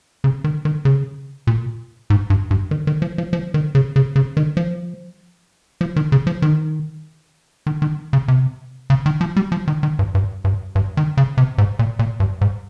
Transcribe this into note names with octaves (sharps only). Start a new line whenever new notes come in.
C#3
D#3
D#3
C#3
A#2
G#2
G2
G2
D#3
D#3
F3
F3
F3
D#3
C#3
C#3
C#3
D#3
F3
F3
D#3
C#3
F3
D#3
D#3
D#3
C#3
C3
C#3
D#3
F3
G3
F3
D#3
D#3
G2
G2
G2
G2
D#3
C#3
C3
G#2
A#2
A#2
G2
G#2